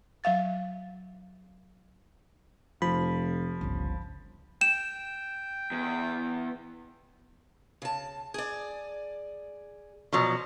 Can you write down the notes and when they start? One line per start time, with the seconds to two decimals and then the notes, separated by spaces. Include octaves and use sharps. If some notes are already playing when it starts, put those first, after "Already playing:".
0.24 F#3 E5 F5 A6
2.82 F1 F3 B5
3.61 G1 C#2
4.61 G5 E7
5.71 E2
7.82 C#3 A5
8.34 G#4 D5
10.13 B2 F3 F#3